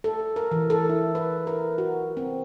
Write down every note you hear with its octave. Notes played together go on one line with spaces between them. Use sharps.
A4
A#4
E3
A4
E4
B4
A#4
F#4
C4